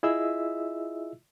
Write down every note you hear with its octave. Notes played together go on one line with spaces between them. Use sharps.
E4 F4 G#4 D#5 E5 E6